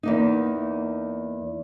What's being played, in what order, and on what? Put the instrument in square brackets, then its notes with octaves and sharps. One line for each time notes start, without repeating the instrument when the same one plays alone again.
[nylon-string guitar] E2 A#3 D#4